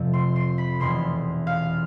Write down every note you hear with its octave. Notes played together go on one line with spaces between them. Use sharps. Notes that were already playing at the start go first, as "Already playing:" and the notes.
Already playing: F2 C3 F3 A3 E4
C6
C6
B5
F1 E2 B2 C6
F5